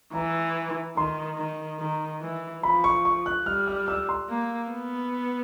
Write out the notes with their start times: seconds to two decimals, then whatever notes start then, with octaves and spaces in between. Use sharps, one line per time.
0.14 E3 A#5
0.96 D#3 C6
1.38 D#3
1.80 D#3
2.22 E3
2.63 F3 B5
2.84 C#6
3.05 C#6
3.26 F#6
3.46 G3 F6
3.67 F6
3.88 E6
4.09 C6
4.30 A#3
4.71 B3